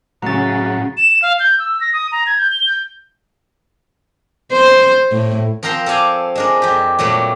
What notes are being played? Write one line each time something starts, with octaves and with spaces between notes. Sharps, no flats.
A2 C#3 F#3 F#5 A#5 A6
E7
E7
F5
G6
E6
A#6
D#6
A#5
G#6
G6
G7
G6
C5
A2
F3 C4 A#4 G5 A#5 C6
A4 C5 D5 F5 G#5 A#5
G#3 D4 A#4
F2 G4
A#2 F#3 G3 A3